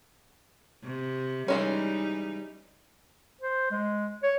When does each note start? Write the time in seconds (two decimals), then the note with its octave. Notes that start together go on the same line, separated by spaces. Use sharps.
0.84 C3
1.48 E3 G3 G#3 C#4 D#4
3.41 C5
3.71 G#3
4.23 C#5